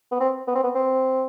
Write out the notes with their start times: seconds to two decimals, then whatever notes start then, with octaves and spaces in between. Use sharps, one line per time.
0.12 B3
0.20 C4
0.48 B3
0.55 C4
0.63 B3
0.75 C4